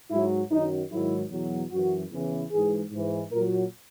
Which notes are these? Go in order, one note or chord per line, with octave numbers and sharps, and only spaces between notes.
G#2 F#3 E4
F#2 D#3 F#3 D#4
G#2 D#3 F#3 E4
E2 B2 F#3
F#2 E3 F#4
E2 C#3 E3
G#2 E3 G#4
G#2 E3
A#2 F#3 A#4